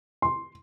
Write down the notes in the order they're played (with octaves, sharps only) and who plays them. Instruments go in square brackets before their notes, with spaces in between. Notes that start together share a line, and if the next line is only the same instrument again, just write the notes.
[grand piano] C6